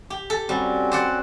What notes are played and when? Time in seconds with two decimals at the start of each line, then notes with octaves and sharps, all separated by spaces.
0.10 G4
0.30 A4
0.49 G3 C4 C#4 F#4
0.92 C5 D5 F#5